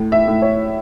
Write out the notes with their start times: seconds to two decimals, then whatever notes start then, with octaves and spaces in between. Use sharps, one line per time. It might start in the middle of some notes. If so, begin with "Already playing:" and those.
Already playing: A2
0.12 E5
0.28 A2
0.42 C#5